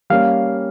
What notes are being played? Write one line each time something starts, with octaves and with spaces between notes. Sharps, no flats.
G3 A#3 C#4 F5